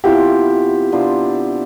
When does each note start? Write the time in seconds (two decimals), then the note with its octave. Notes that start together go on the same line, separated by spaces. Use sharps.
0.04 C3 F3 B3 E4 G4
0.92 C3 F3 B3 D4